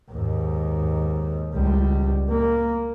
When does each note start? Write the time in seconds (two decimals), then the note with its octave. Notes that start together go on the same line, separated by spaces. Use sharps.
0.11 D#2 G#2
1.54 C#2 G3
2.29 A#3